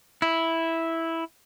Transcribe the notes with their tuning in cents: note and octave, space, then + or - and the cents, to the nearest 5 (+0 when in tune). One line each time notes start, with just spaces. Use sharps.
E4 -5